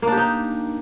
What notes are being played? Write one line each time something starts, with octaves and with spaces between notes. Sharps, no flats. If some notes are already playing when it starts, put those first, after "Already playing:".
A#3 D4 D#4 G4